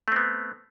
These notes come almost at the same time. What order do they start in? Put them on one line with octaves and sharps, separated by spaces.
A3 C4 B3